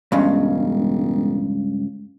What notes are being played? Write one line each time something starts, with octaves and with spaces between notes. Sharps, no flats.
E1 C#2 G2 C#3